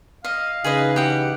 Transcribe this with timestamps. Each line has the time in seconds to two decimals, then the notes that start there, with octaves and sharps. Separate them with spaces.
0.24 D#5 F5
0.64 C#3 E3 D#4 G#4 B4 D#5
0.96 G4 F#5